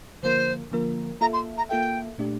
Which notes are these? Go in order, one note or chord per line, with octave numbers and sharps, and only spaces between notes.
D3 F3 A#3 F4 A#4 C5
D3 F3 A#3 F4 A#4
A#3 F4 A4 E5 A#5
C6
A#5
A#3 F4 A4 E5 G5
A#2 A3 D4 G4 D5